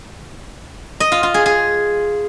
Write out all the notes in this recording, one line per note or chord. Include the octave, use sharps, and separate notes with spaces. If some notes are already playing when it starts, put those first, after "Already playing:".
D#5
F4
F4
G#4
G#4